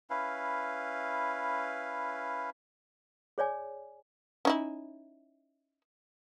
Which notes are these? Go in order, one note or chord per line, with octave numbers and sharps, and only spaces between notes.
C#4 E4 B4 F5
G#4 C#5 D5 G#5
C#4 D#4 E4